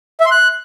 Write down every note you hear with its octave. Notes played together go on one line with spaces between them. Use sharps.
E5
C6
F#6